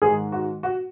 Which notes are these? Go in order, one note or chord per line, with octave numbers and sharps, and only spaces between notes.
G#2 D#3 G#3 G#4
F#4
F#4